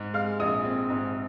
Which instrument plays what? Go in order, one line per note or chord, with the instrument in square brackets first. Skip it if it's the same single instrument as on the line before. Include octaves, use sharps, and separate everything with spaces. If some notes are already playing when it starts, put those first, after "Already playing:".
Already playing: [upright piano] G#2
G#3 F5 F6
A#1 D#5 D#6
C4
G#2